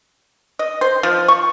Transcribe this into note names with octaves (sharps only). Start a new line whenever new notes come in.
D#5
C5
F3
C#6